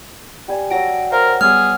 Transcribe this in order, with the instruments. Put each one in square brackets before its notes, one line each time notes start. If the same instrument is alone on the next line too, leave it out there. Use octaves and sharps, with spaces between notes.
[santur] G3 G#5
[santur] F#3 D5 E6 [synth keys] A#6 D7
[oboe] A#4 [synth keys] C5 F5
[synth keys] G3 [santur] B3 C#5 [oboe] G#4 [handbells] F6